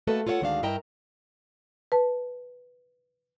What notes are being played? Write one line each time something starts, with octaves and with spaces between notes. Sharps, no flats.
A3 A#3 F#4 A4 B4 D#5
F4 A4 C#5 F5 F#5
D2 D#3 G#3 D4 F#4 F5
G2 E4 A#4 D#5 G5 A#5
B4 A5